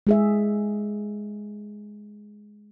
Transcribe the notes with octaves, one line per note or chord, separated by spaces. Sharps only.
G#3 G#4 E5